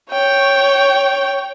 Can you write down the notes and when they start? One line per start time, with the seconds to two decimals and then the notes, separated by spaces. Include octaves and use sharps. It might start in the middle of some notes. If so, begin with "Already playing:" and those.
0.11 C#5 G5